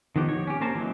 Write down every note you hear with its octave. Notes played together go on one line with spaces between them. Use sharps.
D#3 F3 B3 G4
C#5
C#4 G4
A#3 C#4 A#4 C5 A5
E3 F#3 G#3